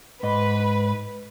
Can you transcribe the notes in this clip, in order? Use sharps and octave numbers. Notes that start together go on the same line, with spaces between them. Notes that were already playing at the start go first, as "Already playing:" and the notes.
G#2 B4 D#5